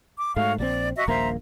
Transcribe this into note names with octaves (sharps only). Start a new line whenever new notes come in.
D6
G#2 A3 F#4 C#5 F5
A#1 F#3 C4 D5
F#4 D#5 E5
D#1 A#1 A#3 C5 E5 A#5